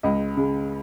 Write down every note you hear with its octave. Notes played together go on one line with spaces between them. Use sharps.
C#2 D#5
C#3 G#3